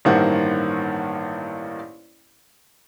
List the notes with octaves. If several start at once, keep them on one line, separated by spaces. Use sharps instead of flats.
A1 G2 D#3 A#3 C5 F#5